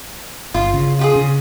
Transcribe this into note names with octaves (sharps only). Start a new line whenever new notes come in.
G1 F4
C#3
F4 G4 G#4
C#3